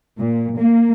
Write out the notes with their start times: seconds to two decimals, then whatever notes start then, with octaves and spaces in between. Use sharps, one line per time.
0.18 A#2
0.57 A#3